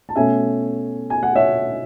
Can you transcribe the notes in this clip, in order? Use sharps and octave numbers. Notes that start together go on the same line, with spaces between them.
A5
B2 A3 C#4 E5 G#5
G#5
F#5
C#5 E5